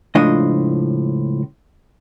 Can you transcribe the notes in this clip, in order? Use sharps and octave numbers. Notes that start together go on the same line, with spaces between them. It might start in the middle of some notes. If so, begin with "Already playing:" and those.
C#2 A2 F3 D4 D#5